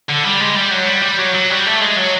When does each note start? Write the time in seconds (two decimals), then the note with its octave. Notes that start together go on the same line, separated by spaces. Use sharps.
0.09 D3
0.24 G3
0.40 G#3
0.56 G3
0.71 F#3
0.87 G3
1.02 G3
1.19 F#3
1.34 F#3
1.50 G3
1.66 A3
1.81 G#3
1.97 F#3